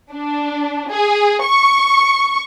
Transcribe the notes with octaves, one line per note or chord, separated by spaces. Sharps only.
D4
G#4
C#6